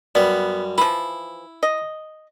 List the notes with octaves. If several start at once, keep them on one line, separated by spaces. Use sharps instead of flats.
F#2 G3 B3 D5
E3 F3 E4 B5
D#5